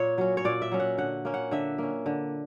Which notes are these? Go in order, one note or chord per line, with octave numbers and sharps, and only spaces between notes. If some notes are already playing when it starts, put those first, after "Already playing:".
Already playing: A#2 C#5
F#3 C#4
C#5
A#2 D5
E5
F#3 C#4
F#5
D3 F#5
A#3 C#4
F#5
D3 E5
A#3 C#4
D3